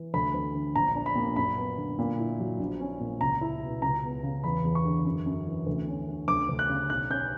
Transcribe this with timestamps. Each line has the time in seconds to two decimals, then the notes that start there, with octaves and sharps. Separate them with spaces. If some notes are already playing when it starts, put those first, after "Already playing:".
Already playing: E3
0.14 D2 B5
0.34 D2
0.55 D3
0.75 A#1 A#5
0.95 D4
1.06 B5
1.15 A#2
1.36 F#2 B5
1.57 B3
1.77 D3
1.99 A#2
2.19 E4
2.40 F#3
2.60 A#1
2.80 C#4
3.00 A#2
3.21 C#2 A#5
3.41 E4
3.62 B2
3.82 C#2 A#5
4.03 B3
4.23 C#3
4.44 E2 B5
4.65 E2
4.75 C#6
4.85 D3
5.05 F#2
5.26 F#2
5.47 E3
5.67 D2
5.87 C#4
6.08 D3
6.28 D2 D6
6.49 D2
6.59 F#6
6.69 C#3
6.90 B1 F#6
7.10 C#4 G6